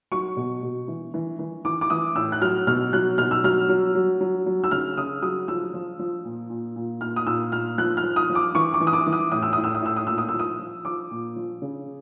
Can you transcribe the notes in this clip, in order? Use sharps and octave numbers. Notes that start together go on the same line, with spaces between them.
F#3 C#6
B2
B2
E3
E3
E3
E3 D6
D6
E3 D#6
A2 E6
F#6
F#3 F6
B2 F6
F#3 F#6
B2 F6
E6
F#3 F6
F#3
F#3
F#3
F#3
E6
C#3 F6
C#3 D#6
F#3 D#6
F3 E6
F3
F3
A#2
A#2
A#2
A#2 F6
D#6
A#2 E6
A#2 F6
F3 F#6
F6
F3
D#6
F3
D6
E3 C#6
D6
E3
D#6
D6
E3
D#6
A2 D#6
E6
A2 D#6
E6
D#6
A2 E6
D#6
A#2 E6
D#6
F3 E6
D#6
F3
F3 D6
A#2
F3
C#3